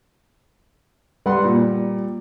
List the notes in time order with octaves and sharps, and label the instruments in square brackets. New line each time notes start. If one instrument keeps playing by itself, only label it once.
[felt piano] G3 [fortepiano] B4 F#5 C6
[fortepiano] A#2